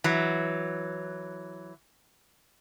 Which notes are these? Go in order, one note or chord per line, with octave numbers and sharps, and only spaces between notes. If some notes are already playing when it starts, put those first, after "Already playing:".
E3 F#3